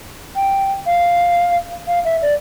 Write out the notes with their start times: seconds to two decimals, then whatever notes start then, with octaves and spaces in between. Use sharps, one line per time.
0.36 G5
0.86 F5
1.88 F5
2.05 E5
2.22 D5